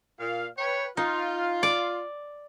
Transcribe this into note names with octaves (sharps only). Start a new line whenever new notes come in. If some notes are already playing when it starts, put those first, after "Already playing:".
A#2 F5
B4 C#5 G5
D#4 F4
D5